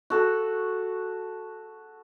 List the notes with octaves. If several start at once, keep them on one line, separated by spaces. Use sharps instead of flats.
F#4 A4